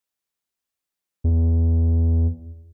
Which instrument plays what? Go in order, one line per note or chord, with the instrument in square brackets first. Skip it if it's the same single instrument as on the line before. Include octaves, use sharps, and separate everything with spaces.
[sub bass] E2